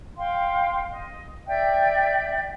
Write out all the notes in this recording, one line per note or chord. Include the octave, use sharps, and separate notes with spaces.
F5 G5 C6
D#5
D5 E5 G5